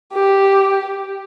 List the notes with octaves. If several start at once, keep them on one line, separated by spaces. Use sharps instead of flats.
G4